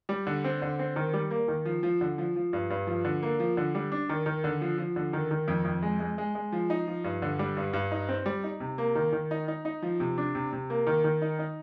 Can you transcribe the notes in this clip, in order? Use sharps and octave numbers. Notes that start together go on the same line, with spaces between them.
G3
D3
C4
D3
C4
D#3
G3
A#3
D#3
F3
F3
D3
F3
F3
G2
G2
F3
D3
A#3
F3
D3
G3
D4
D#3
D#3
D3
F3
F3
D3
D#3
D#3
F2
F2
G#3
G#3
G#3
G#3
F3
D#4
F3
G2
D3
G3
G2
G2
D#4
C4
G3
D#4
C3
A#3
D#3
D#3
D#4
D#4
D#4
F3
C3
D4
C3
C3
A#3
D#3
D#3
D#4
D#4